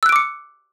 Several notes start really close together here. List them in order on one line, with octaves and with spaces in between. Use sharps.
E6 F#6 D7 D6 C#7